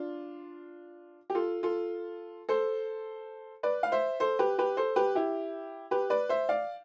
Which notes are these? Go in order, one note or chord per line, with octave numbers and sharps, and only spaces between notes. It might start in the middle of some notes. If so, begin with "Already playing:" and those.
Already playing: D4 F4
G4
F4 A4
F4 A4
A4 C5
B4 D5
F5
C5 E5
A4 C5
G4 B4
G4 B4
A4 C5
G4 B4
E4 G4
G4 B4
B4 D5
C5 E5
D5 F5